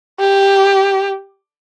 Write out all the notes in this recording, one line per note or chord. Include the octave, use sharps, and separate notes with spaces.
G4